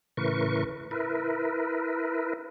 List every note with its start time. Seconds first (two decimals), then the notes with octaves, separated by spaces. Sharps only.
0.17 A2 C#3 E3 A#4 B4 C#6
0.91 E4 A#4 B4